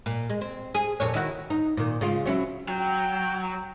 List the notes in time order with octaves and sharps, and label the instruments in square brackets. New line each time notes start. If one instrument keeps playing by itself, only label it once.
[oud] A#2
G#3
C4
G#4
F2 A#2 C#5
D#3 E4 F#4
D#4
A#2 D#3
C#3 G#3 F4
F#3 C#4 E4
[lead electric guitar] F#3 [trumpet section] G5